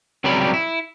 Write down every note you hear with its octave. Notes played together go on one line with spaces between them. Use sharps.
C#2 C3 F#3 G3 G4 B5
E4